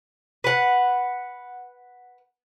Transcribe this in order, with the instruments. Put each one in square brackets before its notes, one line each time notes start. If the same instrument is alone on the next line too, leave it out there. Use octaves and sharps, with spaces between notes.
[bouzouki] B4 F#5